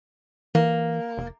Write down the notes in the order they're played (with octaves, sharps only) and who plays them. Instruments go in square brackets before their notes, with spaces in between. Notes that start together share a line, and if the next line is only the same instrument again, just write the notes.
[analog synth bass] E3 [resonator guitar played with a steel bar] A#3
[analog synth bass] F1